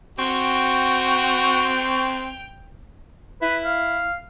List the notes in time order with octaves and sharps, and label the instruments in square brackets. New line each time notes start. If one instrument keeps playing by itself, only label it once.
[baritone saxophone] C4 [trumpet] F#4 [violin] G5 F7 [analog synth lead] C#6
[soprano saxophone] E4 [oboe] B4
[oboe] F5